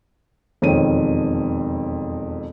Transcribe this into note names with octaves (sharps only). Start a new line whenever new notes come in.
E1 F2 D#3 C4 C#5 D#7